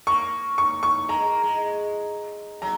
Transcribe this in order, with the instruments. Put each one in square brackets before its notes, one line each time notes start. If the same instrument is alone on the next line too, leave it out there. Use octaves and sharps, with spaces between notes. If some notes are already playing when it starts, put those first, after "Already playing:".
[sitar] A#3 [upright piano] C#6
[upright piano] C#6
C#6
[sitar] G#3 [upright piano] A#5
[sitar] A#3
G#3
[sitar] F#3 [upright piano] A#5